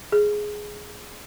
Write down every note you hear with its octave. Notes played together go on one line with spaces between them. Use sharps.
G#4